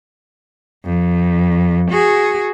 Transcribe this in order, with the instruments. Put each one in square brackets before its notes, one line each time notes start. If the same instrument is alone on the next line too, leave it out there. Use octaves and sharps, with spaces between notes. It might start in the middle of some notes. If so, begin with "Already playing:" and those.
[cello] F2
F#4 G#4